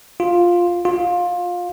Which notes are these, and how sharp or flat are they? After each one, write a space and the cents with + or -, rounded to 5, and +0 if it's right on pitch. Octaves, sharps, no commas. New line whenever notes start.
F4 +5
F4 +20